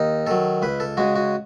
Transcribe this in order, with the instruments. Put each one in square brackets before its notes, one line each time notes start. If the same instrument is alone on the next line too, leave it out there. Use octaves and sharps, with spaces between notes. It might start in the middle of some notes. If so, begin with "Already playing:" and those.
Already playing: [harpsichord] D#2 D#4
D#3 F#3 A4
C#2 B4
A4
C#3 G#3 F#4
F#4